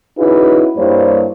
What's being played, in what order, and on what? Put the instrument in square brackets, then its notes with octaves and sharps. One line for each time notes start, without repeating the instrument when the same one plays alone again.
[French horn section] C#4 D#4 E4 F#4 G#4 B4
G2 G3 A#3 E4 C5 C#5